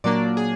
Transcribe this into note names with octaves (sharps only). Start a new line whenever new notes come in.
A#2 F#3 A#3 D4 D5
G#4